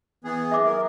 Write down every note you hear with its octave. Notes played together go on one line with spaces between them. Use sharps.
E3 B3 G#4
E5 D6
A#4